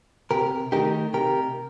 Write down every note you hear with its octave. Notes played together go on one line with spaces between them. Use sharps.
C3 G4 A#4
D#3 A3 D#4 G4 A#4
C3 G4 A#4